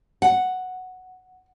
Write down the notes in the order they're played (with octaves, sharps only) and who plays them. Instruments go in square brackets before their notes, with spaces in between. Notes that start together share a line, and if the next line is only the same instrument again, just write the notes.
[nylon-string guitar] F#5